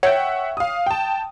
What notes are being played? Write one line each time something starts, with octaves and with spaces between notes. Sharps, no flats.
C#5 E5 F#5 G5
F5 D#6
G5 A5